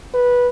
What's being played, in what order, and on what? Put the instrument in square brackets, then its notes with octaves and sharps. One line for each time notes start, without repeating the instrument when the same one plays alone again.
[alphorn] B4